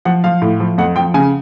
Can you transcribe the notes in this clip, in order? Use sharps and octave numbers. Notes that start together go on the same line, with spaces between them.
F3 F#5
F3 F5
A2
F3
F2 F#5
F3 G5
C#3 G#5